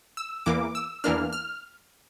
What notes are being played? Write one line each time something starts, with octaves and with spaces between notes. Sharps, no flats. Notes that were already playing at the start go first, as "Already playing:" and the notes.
E6
E2 E3 A#3 D6
E6
E2 E3 A#3 D4 F6
F6